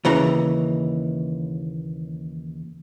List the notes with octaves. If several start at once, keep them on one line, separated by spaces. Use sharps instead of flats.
D#2 C#3 E3 A#5